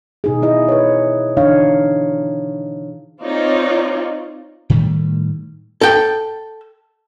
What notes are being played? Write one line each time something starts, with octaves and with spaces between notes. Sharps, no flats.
B2 D#4 G#4
E4 G#4 D#5
B4 C#5
D3 E3 D4 D#4 C#5 F5
C4 D#4 F4 C#5 D5
A2 D#3 G3 A3
A4 G5